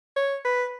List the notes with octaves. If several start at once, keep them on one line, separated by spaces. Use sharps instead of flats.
C#5
B4